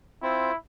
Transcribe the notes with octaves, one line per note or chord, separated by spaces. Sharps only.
C4 E4 F4 C5